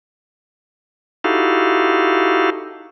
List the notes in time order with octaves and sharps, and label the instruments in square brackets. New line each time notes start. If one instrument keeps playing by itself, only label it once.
[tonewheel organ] D#4 E4 F#4 G4 A4 F5